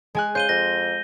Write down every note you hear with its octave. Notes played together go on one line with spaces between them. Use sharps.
G#3 G#5 F#6
C#3 C5 G6 D#7 G7
F2 A#6